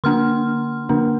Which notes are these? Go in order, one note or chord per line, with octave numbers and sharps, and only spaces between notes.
D3 A#3 D4 C6 F6
D3 A#3 D4